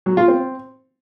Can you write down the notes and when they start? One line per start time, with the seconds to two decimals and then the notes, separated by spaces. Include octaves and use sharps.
0.06 F#3
0.17 F4
0.28 C4